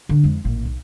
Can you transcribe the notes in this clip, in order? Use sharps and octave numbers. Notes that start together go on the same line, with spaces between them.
D3
F2 G#3
A1 A#2
B1